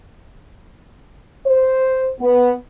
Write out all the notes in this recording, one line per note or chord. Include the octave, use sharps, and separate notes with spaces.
C5
B3